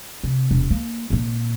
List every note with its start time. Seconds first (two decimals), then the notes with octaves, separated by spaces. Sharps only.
0.23 C3
0.51 E1 C2
0.70 A#3
1.10 G#1 A#2